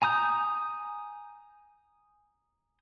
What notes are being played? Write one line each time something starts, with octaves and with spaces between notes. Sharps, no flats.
G#5 A#5 D#6 G6